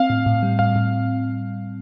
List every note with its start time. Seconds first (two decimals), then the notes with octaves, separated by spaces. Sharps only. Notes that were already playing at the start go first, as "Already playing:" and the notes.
Already playing: C4 F5
0.10 A2
0.26 A2
0.43 G3
0.59 A2 F5
0.76 A2